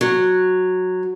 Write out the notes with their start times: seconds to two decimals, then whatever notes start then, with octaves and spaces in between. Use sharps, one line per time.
0.01 F#3